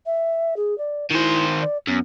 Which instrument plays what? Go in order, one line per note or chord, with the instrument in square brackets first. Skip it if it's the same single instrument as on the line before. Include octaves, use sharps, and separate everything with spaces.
[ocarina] E5
G#4
D5
[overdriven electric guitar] D#3 C5 [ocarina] E4
[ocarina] D5
[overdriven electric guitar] F#2 [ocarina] B3